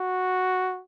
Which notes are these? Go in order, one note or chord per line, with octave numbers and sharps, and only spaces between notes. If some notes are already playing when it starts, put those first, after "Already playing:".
Already playing: F#4